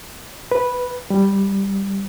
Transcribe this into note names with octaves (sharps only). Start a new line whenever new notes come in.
B4
G3